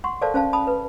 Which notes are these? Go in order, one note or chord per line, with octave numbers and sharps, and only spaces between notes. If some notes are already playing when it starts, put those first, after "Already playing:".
F#5 C6 C#6
A4 A#4 C5 D5 F5 A5
C#4 C5 F5 A5
A5 B5 D#6
B4